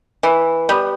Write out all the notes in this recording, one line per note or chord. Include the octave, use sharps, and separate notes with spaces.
E3
G3 B3